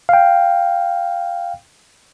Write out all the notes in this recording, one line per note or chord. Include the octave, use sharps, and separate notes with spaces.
F5 G5